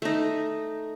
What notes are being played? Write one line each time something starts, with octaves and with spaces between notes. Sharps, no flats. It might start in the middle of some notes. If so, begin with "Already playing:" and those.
A3 D#4